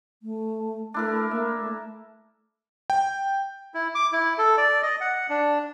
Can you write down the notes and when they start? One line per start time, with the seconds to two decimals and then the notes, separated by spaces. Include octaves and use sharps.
0.23 A3
0.94 A3 D4 E4 A#4
1.31 A#3 E5
1.60 A3
2.90 G5
3.74 E4
3.95 D6
4.12 E4
4.38 A4
4.57 D5
4.83 D#5
5.01 F#5
5.30 D4